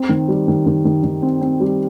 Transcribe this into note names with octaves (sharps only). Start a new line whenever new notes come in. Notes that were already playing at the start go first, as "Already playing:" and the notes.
Already playing: C4
D#3
G3
D#3
D#3
D#3
D#3
C4
C4
G3